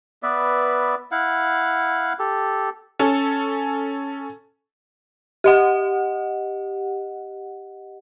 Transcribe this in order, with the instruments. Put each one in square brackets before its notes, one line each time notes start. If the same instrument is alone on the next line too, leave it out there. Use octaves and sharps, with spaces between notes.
[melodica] B3 B4 D5 E5
E4 F5 F#5
G4 A4
[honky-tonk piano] C#4 A4
[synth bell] G4 D#5 F#5